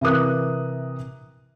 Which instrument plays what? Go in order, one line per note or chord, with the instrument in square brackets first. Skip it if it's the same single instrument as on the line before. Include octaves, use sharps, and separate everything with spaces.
[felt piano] C3 E3 A#4 D#6 F#6